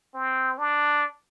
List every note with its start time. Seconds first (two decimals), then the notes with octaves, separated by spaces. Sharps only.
0.15 C4
0.58 D4